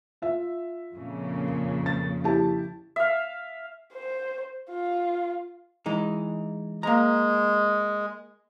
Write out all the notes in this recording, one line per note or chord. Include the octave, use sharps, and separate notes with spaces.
F4 E5
F2 A#2 C#3
A6
E4 G4 A5
E5 F5
C5
F4
E3 G#3 D#4
G#3 A#3 A#5